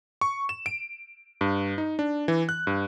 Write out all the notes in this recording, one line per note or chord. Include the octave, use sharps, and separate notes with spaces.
C#6
E7
D7
G2
D#4
D4
E3
F#6
G2